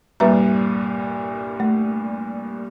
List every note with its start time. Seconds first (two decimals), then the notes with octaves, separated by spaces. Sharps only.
0.20 C2 G2 A#2 B4 E5 A#5
1.60 A3